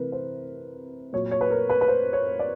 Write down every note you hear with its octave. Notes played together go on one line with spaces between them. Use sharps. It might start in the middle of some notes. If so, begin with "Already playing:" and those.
Already playing: C3 E3 A#4 B4
C5
A#2 F#3 C#5
C#5
B4
A#4
B4
B4
C5
C#5
D5